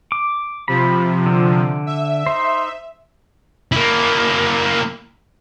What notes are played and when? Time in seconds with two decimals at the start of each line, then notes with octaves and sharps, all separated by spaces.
0.12 D6
0.68 C3 F3 B5
1.26 D3
1.86 E5
2.26 D#4 C5
3.72 A#3 E4